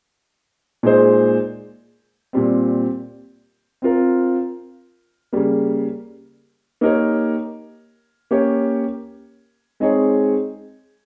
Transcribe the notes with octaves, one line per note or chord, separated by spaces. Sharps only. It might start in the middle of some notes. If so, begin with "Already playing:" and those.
A#2 G#3 D#4 G#4 C5
A#2 G3 C4
C4 F4 A#4
C#3 G3 A#3
A#3 D#4 G4 A#4 C#5
A#3 C#4 G4 C#5
G#3 C4 D#4 G#4 C#5